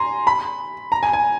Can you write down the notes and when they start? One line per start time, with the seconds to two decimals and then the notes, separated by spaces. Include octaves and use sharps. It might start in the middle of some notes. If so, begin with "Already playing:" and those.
Already playing: G#5 A#5 C6
0.27 B5
0.92 A#5
1.03 G#5
1.13 G#5